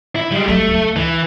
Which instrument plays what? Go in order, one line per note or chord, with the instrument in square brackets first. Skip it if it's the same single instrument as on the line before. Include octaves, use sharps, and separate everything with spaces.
[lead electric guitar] E4
G3 G#3
[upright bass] F#3 G3 [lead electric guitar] A3
[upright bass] C#2
[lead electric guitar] E3